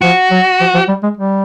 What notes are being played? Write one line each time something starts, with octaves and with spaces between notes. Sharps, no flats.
F3 F#4
F#3
F3
F3
G3
G#3
G3